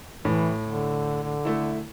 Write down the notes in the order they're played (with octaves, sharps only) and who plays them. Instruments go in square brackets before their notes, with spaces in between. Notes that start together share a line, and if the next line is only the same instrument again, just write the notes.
[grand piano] A2 [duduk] E3
[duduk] D3
D3
[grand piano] A3 E4